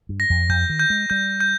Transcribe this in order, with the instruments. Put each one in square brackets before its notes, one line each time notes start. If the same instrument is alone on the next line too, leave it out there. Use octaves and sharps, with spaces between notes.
[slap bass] G2
[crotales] A#6
[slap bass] F2
[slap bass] F2 [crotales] G6
[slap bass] D#3
[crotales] G6
[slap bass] G#3
[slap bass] G3 [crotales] G6
[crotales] G6